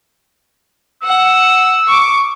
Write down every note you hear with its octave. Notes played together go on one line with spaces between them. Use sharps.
F#5 E6
C#6 D6